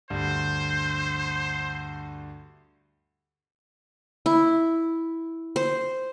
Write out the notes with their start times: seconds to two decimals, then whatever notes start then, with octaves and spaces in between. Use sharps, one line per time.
0.10 D2 G2 C5
4.26 E4
5.56 C5